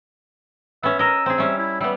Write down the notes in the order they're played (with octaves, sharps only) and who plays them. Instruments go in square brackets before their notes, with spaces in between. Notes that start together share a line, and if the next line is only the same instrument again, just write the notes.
[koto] B3 C#4 [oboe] E5
[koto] A#4 D#5 [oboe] E6
[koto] C4 G#4
[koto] G3 C#4 [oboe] E5
[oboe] E4
[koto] G3 B3 [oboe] E5